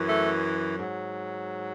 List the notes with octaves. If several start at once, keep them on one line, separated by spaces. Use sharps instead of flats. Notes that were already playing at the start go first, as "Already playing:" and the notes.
Already playing: F#2 E3
A3
G#2 F#3